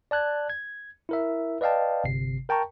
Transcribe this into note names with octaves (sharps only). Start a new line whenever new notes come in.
D5 A5 F#6 G#6
G#6
E4 A#4 E5
B4 D5 D#5 F5 G5 A5
G1 C3 C7
A#4 G5 A5 A#5 C#6